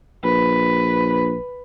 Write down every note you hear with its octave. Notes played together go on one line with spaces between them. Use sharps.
A#1 B4